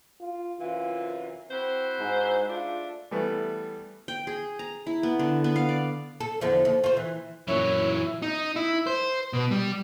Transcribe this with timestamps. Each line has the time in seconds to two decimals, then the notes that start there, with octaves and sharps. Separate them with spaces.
0.21 F4
0.60 F#2 C3 E3 F4
1.51 C4 E4 F#4 C5
1.98 G#2
2.50 G#3 A3 D4 F4
3.11 E3 G3 A3 B3
4.08 G5
4.27 G#4
4.59 A#5
4.87 E4
5.03 B3
5.19 D3
5.44 B3
5.56 F5
5.69 D5
6.20 A4
6.41 E2 D3 F3
6.65 D#2
6.84 F4 C5
6.97 E3
7.48 F#2 A#2 E3 F#3 E4 C#5
8.22 D#4
8.56 E4
8.87 C5
9.33 B2
9.51 G3